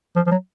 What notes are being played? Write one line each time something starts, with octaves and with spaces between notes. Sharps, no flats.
F3
F3
F#3